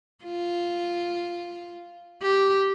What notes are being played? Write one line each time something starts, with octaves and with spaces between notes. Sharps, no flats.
F4
G4